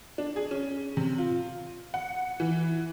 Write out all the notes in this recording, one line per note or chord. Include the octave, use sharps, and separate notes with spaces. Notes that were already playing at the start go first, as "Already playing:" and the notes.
D4
G#4
C#4
C3
F4
F#5
E3